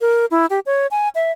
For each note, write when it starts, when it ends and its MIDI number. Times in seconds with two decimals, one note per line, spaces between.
0.01 0.26 70
0.31 0.46 64
0.50 0.60 67
0.66 0.87 73
0.91 1.09 80
1.15 1.32 76